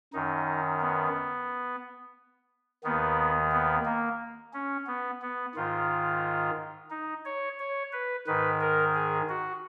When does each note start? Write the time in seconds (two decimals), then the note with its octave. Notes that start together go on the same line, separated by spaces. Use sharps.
0.13 F#2 D#3 D#4
0.81 B3
2.84 D#2 D#3 B3
3.52 B3
3.86 A#3
4.53 C#4
4.87 B3
5.22 B3
5.55 G#2 D#3 F4
6.90 D#4
7.25 C#5
7.59 C#5
7.93 B4
8.27 G#2 D#3 B4
8.61 A#4
8.94 G#4
9.29 F#4